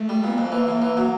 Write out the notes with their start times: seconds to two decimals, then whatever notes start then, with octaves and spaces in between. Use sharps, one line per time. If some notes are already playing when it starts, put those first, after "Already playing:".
Already playing: A3
0.09 G3
0.24 A#2 B3
0.38 F2 A#3
0.52 E3
0.67 A2
0.82 E3
0.97 F#3